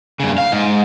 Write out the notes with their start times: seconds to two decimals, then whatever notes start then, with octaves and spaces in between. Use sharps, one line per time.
0.20 G2 C#3
0.38 F5
0.52 G#2